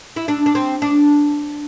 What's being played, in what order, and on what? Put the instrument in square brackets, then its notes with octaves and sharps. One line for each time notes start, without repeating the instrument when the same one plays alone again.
[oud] E4
D4
D4
C4
D4